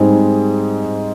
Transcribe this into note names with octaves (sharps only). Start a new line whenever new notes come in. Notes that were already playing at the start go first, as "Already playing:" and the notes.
Already playing: G#2 G3 C4 D#4 G#4